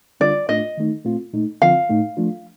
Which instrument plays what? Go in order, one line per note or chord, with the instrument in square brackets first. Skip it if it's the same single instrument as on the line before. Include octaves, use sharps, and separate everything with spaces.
[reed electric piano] D3 G3 D4 F4 [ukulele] D5
[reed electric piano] A2 A3 D4 F4 [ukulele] D#5
[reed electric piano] D#3 A3 D#4
A#2 A3 C4 F4
A#2 A3 D#4
[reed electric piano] D3 F3 C4 F4 [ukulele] F5
[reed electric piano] A2 A3 D#4
F3 A3 D4 F4